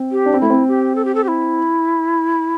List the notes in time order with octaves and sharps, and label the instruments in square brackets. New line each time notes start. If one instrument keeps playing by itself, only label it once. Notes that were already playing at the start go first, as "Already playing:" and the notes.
Already playing: [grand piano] C4
[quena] G4
[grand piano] D4
C4
[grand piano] A3 [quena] E4
[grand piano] C4
[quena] G4
A4
G4
A4
G4
E4